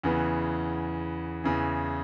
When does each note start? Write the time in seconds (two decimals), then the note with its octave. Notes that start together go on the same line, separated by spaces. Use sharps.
0.03 E2 C#3 E3 B3
1.44 E2 C#3 E3